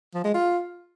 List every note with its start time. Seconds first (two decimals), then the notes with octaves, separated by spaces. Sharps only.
0.14 F3
0.24 G#3
0.34 F4